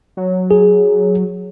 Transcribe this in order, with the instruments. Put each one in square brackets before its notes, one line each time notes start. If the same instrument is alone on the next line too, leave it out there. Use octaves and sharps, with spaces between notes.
[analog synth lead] F#3
[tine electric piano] G#4